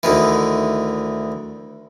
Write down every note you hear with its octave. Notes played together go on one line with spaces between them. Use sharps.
D2 D#3 E3